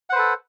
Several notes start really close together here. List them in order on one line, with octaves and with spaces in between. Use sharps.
F#5 C5 B4 A4